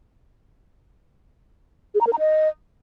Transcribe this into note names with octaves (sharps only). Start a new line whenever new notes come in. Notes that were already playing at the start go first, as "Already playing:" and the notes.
G#4
A#5
A#4
A#5
D#5